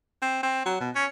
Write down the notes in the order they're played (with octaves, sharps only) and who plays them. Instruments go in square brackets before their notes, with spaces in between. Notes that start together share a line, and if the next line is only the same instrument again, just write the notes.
[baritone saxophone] C4
C4
F#3
B2
C#4